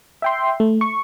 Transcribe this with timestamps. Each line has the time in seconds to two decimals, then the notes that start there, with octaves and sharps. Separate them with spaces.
0.22 E5 G5 C6
0.60 A3
0.81 C#6